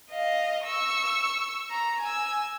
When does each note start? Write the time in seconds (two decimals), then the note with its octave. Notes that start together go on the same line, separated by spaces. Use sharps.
0.11 D#5 F5
0.65 C#6 E6
1.70 A#5
2.01 G#5 E6